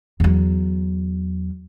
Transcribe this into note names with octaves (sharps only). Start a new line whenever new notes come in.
E2 F#3